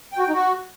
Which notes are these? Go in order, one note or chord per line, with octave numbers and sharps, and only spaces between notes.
G5
F#4
G5
D#4
F#4